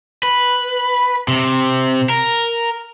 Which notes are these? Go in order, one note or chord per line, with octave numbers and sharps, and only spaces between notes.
B4
C3
A#4